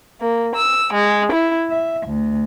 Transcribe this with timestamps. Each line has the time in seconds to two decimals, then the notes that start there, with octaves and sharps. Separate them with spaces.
0.22 A#3
0.54 E6
0.94 G#3
1.32 E4
1.70 E5
2.08 D2